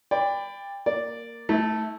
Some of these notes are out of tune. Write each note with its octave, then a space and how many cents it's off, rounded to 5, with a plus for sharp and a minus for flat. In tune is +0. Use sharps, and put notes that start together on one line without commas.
D5 +0 G5 +30 B5 +25
A#3 -5 D5 +0
A3 +0 E4 -40